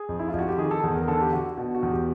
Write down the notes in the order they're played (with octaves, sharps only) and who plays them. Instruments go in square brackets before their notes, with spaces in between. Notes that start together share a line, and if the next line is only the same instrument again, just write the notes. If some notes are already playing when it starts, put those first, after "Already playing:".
Already playing: [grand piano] G#4
F2
E4
F4
F2
F#4
G4
D#3 G#4
A4
E2 G#4
A#4
D3 A4
G4
D3 F#4
B2 F#4
F#4
E2
G4